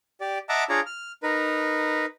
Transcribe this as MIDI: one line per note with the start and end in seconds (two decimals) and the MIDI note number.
0.21 0.38 67
0.21 0.38 74
0.49 0.64 75
0.49 0.64 76
0.49 0.64 78
0.49 0.64 81
0.49 0.64 82
0.49 0.64 86
0.69 0.81 62
0.69 0.81 65
0.69 0.81 68
0.69 0.81 73
0.69 0.81 74
0.69 0.81 82
0.86 1.12 89
1.23 2.06 63
1.23 2.06 70
1.23 2.06 71